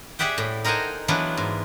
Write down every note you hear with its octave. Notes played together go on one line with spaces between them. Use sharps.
G4 G#4 D5 E5 F#5 G5
A2
D#4 A#4 C5 F#5 G#5 A5
E3 F#3 B3 D4 F4
G#2